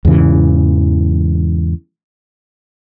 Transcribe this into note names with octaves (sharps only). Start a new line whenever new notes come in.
E2 G#2 C#3 E3